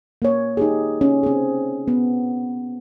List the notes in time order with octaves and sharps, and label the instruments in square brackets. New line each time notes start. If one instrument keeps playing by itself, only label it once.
[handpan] A#3 C#5
D#4 G4 G#4
C#4
C4 G#4
B3